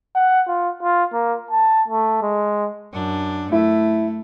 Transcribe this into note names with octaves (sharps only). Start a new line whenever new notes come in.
F#5
F4
F4
A#3
A5
A3
G#3
F#2 D4
A3 E4